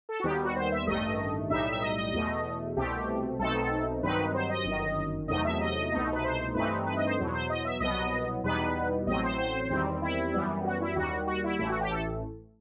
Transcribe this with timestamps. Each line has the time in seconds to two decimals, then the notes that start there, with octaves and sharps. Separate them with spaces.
0.09 A4
0.20 F#4
0.24 D#2 D#3 G3 B3 G4
0.45 F#4
0.56 C5
0.72 E5
0.87 A1 G2 D#3 A3 D#5
1.50 B1 A2 G3 D#4 E5
1.72 E5
1.82 D#5
1.98 D#5
2.13 E2 B2 A3
2.76 C2 B2 A3 C4 G4
3.39 B1 B2 A3 C4 D#4 A4
4.02 G2 D#3 F#3 C4 D#4 B4
4.34 C5
4.49 D#5
4.65 G1 F#2 D#3
5.28 E2 C3 F#3 A3 D#4 D#5
5.45 E5
5.61 D#5
5.92 C2 B2 A3 D#4
6.13 B4
6.24 C5
6.54 G2 E3 A3 C4 D#4 B4
6.86 B4
6.97 D#5
7.07 C5
7.18 E2 B2 F#3
7.33 C5
7.50 D#5
7.65 E5
7.80 C2 B2 F#3 B3 D#5
8.44 E2 B2 G3 B3 D#4 B4
9.07 A1 A2 F#3 C4 D#5
9.23 C5
9.38 C5
9.70 E2 D#3 G3 C4
10.02 E4
10.33 F#2 E3 G3 B3
10.65 F#4
10.81 E4
10.96 D#2 D#3 G3 F#4
11.27 F#4
11.44 E4
11.59 A1 A2 E3 A3 E4
11.69 F#4
11.81 G4
11.91 A4